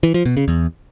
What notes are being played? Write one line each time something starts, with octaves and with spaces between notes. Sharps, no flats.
E3
F3
B2
C#3
E2